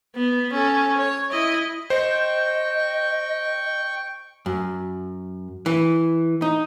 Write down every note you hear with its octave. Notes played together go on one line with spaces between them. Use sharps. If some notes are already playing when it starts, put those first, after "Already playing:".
B3
C#4 A4
C#5
E4 D#5
C5 D#5 G5 C#6
F#2
E3
D#4